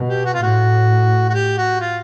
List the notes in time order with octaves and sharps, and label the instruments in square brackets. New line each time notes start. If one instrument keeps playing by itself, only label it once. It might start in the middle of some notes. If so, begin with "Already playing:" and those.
Already playing: [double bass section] B2
[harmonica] G4
F#4
F4
[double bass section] A2 [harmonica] F#4
[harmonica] F#4
G4
F#4
F4